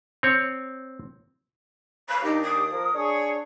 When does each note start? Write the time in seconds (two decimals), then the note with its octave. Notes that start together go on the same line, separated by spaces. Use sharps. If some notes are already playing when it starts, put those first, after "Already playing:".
0.23 C4 C#5
2.08 C#5 F5 B5
2.23 D#2 D4 D#4 G4 D6
2.42 D#6
2.71 F3 A#4
2.94 D4 G#4 C#5 C#6